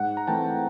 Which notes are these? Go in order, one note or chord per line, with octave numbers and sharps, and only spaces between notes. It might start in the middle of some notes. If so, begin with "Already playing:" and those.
Already playing: G#2 F#5
A#5
E3 A3 C4 G5 A5